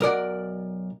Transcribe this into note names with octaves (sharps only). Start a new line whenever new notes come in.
B1 A#4 D5 F#5